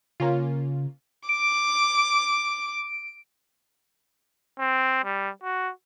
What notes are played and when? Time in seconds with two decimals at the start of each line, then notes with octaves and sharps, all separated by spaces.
0.20 C#3 A#3 C#4 F4
1.29 D6 D7
4.59 C4
5.05 G3
5.43 F#4